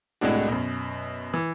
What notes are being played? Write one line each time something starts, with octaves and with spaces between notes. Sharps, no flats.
C2 A2 G#3 D4 F#4
F#2 B2
E3